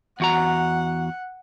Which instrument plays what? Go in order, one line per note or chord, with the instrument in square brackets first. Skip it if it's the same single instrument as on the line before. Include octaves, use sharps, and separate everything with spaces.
[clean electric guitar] E2 F#4 A#5 [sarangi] F#5